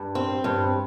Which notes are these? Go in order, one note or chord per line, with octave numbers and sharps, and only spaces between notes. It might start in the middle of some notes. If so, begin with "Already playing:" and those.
Already playing: G2
C4
G2